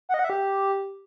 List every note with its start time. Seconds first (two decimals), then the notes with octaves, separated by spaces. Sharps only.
0.09 F#5
0.14 D#5
0.19 F#5
0.24 E5
0.30 G4